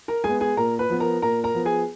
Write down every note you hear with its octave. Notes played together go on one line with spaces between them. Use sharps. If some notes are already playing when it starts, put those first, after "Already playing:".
A#4 A#5
G#3 B3 G#4 G#5
G#4 G#5
A#2 A#4 A#5
B4 B5
F3 B3
A#4 A#5
A#2 A#4 A#5
A#4 A#5
F3 B3
G#4 G#5